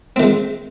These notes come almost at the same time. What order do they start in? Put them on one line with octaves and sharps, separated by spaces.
C4 D#3 G#3